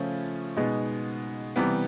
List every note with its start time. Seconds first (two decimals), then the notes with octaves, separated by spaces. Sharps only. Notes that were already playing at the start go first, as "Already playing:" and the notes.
Already playing: C#3 F3 A3 C#4 F4
0.57 B2 G#3 B3 D#4
1.56 C3 E3 G3 B3